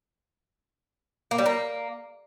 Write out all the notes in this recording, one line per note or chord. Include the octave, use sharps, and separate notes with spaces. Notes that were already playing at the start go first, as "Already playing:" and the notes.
A#3
G3
A#3